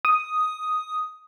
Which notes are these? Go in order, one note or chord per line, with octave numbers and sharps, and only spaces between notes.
D#6